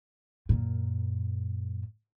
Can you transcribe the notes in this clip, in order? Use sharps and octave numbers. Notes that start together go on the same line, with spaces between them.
F#2 A#2